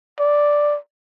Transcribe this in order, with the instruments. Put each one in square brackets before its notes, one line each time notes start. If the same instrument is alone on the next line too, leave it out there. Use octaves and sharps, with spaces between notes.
[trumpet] D5